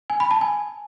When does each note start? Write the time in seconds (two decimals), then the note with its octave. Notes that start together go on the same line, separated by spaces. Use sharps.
0.10 G#5
0.20 B5
0.31 A5
0.41 G#5